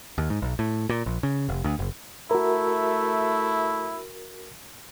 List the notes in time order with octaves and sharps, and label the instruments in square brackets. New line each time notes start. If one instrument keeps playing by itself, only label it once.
[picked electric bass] D#2
G#2
B1
A2
A#2
A#1
C#3
F1
D2
F#1
[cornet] A3 [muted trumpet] E4 [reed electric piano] F#4 A#4